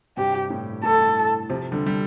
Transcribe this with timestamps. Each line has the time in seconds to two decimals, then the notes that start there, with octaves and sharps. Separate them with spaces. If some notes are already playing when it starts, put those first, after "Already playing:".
0.17 G2 C3 G4
0.50 A2
0.83 A2 A4
1.50 C3 F3
1.72 D3 G3
1.87 G3